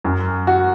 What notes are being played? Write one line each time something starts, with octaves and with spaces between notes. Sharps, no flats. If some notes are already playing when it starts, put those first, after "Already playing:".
F#2
F#4